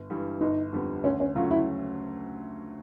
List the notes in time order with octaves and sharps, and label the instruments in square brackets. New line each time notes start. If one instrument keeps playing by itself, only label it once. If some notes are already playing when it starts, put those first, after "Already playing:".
Already playing: [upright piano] G1
G2 E3 G3
[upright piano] G1 [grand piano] D#4
[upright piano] F2 D3 G3 B3
[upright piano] D2 [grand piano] C#4
[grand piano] C#4
[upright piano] C#3 F#3 A3 C#4 [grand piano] F4
[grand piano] E4